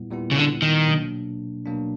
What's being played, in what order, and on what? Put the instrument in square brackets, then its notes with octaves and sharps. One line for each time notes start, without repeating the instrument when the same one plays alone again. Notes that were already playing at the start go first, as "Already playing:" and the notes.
Already playing: [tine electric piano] A#2 G3 B3 E4
A#2 G3 B3 E4
[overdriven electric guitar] C#3
D3
D#3
[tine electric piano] B2 F#3 A#3 D4
B2 F#3 A#3 D4